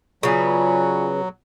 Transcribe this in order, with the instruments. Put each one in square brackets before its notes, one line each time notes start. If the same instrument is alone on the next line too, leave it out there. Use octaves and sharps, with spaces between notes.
[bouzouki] C#3 B3 [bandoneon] F#3 [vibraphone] F4 D5 G#5